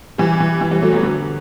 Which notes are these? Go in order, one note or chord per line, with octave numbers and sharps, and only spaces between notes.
E3 G3
E3
E3
E3 G3
F#3 A3
G3 B3
D3